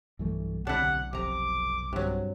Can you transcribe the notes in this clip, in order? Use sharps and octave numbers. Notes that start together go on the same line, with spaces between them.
B1 G2 E3 A3
D2 C3 D4 E4 F#5
F1 C3 A#5 D6
G2 C3 F#3